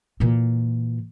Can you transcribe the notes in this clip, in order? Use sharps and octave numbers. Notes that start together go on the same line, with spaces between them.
A#2 E3